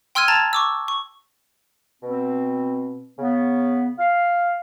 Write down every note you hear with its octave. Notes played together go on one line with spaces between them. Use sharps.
G5 C6 E6 F6 G#6 D#7
A5 A#5 G#6 A6
C#6 D6 E6
C#6
B2 C4
C#3 B3
F5